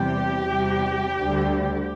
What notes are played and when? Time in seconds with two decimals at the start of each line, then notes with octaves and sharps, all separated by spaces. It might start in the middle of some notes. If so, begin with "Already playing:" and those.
Already playing: E2 C3 E3 G3 G4
0.45 E2 C3 G3
1.16 D2 D3 G3